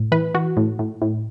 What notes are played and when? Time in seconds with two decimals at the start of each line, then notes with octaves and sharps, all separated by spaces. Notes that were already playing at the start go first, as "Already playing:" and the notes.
Already playing: A2
0.12 E3 B4
0.34 E3 F#4
0.57 A2
0.79 A2
1.02 A2